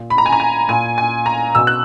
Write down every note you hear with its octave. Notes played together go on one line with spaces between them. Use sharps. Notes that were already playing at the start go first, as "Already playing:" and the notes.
Already playing: A#2
B5
A#5
G#5
A#5
G#5
A#2 G#5
G#5
A#5
B2 E6
F#6